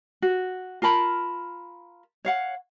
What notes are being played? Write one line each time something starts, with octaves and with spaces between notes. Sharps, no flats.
F#4
F4 A#4 A5 B5
C#5 F5 F#5